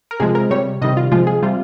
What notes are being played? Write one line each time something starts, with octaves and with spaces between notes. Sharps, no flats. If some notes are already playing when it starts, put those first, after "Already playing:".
A#4
C3 F3 G#3 G#4
A#4
C3 G3 C#5
C3 D#3 G3 D#5
F4
C3 F3 G#3 F4
G#4
C3 G3 F4